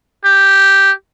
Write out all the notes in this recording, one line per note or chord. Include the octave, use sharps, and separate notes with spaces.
G4